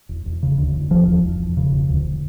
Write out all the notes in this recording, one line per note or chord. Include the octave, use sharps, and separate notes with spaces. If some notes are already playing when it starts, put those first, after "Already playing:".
E1
E1
C#3
D2
E1
E1 F3
E1
E1
E1
C#3
E1
D2